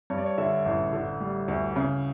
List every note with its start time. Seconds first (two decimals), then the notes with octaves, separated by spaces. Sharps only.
0.10 G2 C#5
0.18 D5
0.26 C#5
0.38 D3 E5
0.65 A1 E5
0.93 D3
1.21 G3
1.48 D2
1.76 C#3